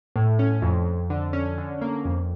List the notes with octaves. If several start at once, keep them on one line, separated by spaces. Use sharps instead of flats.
A2
C#4
F2
F2
D3
C#4
D3
A#3
F2